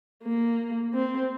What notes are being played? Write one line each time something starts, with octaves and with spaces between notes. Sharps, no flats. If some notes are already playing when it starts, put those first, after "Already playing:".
A#3
C4